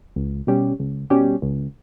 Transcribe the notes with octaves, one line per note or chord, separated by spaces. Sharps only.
C#2
B2 G3 C#4 G4
C#2
B2 G3 C#4 G4
C#2